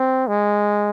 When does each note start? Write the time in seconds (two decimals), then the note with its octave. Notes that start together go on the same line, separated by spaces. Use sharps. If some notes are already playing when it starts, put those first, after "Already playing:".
Already playing: C4
0.27 G#3